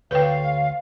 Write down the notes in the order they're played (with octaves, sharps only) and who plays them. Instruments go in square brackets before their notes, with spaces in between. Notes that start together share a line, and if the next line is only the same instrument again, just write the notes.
[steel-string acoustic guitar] D2 C#5 [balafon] B4 G5 [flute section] F5